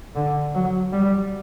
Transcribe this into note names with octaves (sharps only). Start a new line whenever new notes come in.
D3
F#3
G3